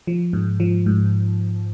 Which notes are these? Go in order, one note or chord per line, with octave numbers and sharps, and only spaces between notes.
F3
G#2
F3
G#2